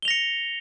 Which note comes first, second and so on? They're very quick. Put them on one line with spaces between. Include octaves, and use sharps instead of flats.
G7 F7 A#6 C#7